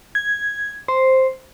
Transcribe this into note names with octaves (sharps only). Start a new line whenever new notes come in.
G#6
C5